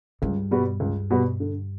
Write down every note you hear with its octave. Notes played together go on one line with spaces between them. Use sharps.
C#2 G2
B2 G3 B3 F#4
C#2
B2 G3 B3 F#4
D3